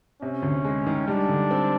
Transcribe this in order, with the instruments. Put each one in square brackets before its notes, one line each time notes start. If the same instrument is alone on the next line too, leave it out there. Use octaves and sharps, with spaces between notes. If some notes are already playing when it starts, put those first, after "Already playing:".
[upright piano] C3 [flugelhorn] C#4
[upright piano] D2
G#3
D#3
[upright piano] G3 [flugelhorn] D4
[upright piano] D3
C4